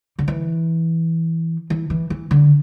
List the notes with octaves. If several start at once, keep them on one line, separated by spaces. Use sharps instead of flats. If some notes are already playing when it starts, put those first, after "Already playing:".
D3
E3
E3
E3
E3
D3